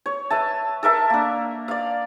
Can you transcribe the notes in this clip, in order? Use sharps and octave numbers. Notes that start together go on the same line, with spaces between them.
C#5
B4 E5 A5
A4 A#4 E5 A5
A#3 D4
D5 F5